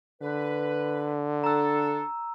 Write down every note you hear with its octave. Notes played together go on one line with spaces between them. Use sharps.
D3 B4
D4 A4 A#5 E6